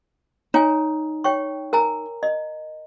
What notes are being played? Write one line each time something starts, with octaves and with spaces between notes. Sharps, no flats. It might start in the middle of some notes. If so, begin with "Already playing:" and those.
D#4 C#5 G#5
C#5 G5 C#6
A#4 G#5 A#5
D#5